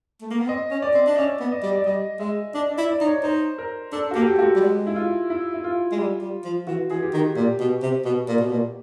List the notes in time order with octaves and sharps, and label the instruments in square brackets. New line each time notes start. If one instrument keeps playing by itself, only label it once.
[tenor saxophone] A3
A#3
B3
[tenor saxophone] C4 [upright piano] D#5
[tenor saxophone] C#4
[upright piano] D5
[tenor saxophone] C4
D4
[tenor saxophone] C#4 [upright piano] E5
[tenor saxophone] B3
[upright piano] D#5
[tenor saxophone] G3
[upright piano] D5
[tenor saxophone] G3 [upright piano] D#5
[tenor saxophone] G#3 [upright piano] E5
[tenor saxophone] D4 [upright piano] D#5
[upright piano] D5
[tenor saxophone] E4
[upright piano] D5
[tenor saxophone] D#4
[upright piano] C#5
[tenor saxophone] D#4 [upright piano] C5
[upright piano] A#4
[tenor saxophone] D4 [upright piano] A4
[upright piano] F#4
[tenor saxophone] A#3 [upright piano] G4
[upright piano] G4
[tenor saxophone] A3 [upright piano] F#4
[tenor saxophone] G3
G#3
[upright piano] E4
F4
E4
E4
F4
[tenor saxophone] G#3
G3
G3
F3
[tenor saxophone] E3 [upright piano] F#4
[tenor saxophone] E3 [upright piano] G#4
[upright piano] G4
[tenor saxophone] D#3
[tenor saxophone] A#2 [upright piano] G4
[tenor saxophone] B2
C3
B2
A#2
B2
A#2